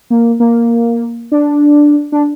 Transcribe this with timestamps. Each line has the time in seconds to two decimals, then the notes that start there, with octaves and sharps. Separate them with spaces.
0.10 A#3
0.40 A#3
1.32 D4
2.12 D4